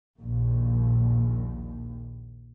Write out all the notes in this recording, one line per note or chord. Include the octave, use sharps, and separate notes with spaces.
A#1 D#2